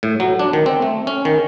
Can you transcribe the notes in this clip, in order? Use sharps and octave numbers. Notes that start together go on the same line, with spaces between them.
A2
F#3
D4
D#3
C4
A3
C#4
D#3